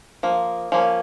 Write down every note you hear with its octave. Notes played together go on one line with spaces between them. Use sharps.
F3 A#3
F3 A#3 C#4